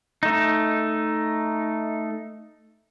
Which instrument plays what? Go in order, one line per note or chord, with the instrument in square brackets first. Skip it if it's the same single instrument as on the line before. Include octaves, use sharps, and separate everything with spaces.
[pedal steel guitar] A3 D#4